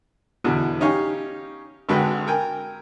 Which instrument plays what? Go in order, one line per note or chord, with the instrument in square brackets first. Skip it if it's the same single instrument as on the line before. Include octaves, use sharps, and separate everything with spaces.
[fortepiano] E2 B2 D3 E3 B3
C#4 D#4 G4 C#5 F5 G#5
G#1 D3 G#3 F#4 B4 G5
A#4 G5 G#5